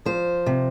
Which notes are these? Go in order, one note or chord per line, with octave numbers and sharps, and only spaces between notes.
F3 C5
C3